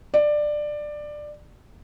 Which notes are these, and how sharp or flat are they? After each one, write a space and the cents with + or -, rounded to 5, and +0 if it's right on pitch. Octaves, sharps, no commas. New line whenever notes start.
D5 +15